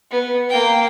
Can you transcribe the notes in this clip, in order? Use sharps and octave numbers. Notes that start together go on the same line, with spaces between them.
B3
A#3 G5